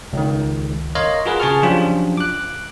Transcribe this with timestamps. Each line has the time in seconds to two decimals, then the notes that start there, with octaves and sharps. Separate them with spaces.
0.13 C#2 D#3
0.95 A#4 C#5 D#5 F5 C6
1.25 F4 F#4 G#4 A#4 B4
1.40 C#3 G#4 G#5 A5 C#6 F6
1.63 F3 F#3 C#4 D4 F4 G4
2.17 D6 F#6